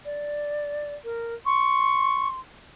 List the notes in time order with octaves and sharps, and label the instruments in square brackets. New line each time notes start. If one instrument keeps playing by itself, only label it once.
[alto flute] D5
A#4
[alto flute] C6 [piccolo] C#6